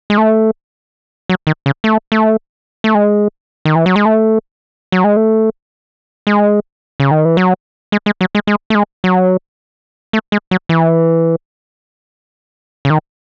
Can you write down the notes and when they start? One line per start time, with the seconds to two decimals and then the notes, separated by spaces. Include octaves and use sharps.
0.10 G#3
0.18 A3
1.29 F#3
1.47 D#3
1.66 C#3
1.84 A3
2.12 A3
2.84 A3
2.95 G#3
3.65 D#3
3.75 E3
3.86 F#3
3.96 G#3
4.05 A3
4.92 F#3
5.04 G#3
5.17 A3
6.27 G#3
7.00 C#3
7.11 D#3
7.25 E3
7.37 F#3
7.92 G#3
8.06 G#3
8.21 F#3
8.35 G#3
8.47 G#3
8.70 A3
8.75 G#3
9.04 F#3
10.13 A3
10.32 G#3
10.51 F#3
10.69 E3
12.85 C#3
12.90 D#3